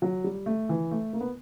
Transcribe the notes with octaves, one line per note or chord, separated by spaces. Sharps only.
F#3
G3
A3
E3
A3
A#3
B3